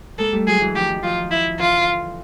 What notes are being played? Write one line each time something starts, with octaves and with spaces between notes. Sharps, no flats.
G#3 A#3 A4
G3 A3
F#3 G#3 G#4
E3 F#3
D#3 F3 G4
D#3 F3 F4
E4
D3 E3 F4